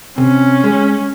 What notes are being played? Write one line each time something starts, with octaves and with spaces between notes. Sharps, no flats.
C3 C#4
G#3